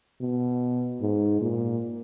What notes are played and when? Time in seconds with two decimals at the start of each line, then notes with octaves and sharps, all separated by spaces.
0.21 B2
1.01 G#2
1.41 A#2